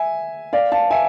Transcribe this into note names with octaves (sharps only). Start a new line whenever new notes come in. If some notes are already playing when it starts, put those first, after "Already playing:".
Already playing: E5 G#5
D5 F5
F5 A5
E5 G#5